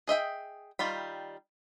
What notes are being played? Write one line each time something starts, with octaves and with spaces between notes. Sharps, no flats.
G#4 D#5 E5 G5
D#3 G3 F4 B5